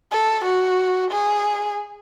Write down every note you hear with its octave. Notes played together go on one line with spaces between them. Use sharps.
A4
F#4
G#4